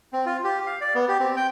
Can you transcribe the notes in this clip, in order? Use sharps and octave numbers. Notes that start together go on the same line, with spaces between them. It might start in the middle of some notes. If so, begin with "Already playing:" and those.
C4
F4
G4
F5
D5
B3
G4
C4
G5